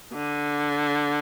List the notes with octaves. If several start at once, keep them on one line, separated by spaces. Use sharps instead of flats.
D3